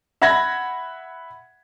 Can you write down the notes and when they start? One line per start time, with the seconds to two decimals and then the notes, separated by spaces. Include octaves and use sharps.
0.22 E5 F#5 B5 G#6 A#6